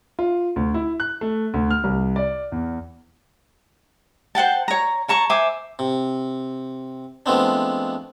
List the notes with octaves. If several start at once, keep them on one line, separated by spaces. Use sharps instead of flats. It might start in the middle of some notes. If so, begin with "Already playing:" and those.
F4
D2
E4
F#6
A3
D2
F6
C2
D5
E2
C5 F#5 G5 A5
C#5 A#5
C#5 A5 A#5 C#6
C5 E5 G#5 D6
C3
F3 G#3 A3 B3 C4 D4